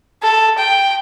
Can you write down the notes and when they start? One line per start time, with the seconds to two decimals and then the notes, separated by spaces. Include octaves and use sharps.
0.23 A4
0.59 G5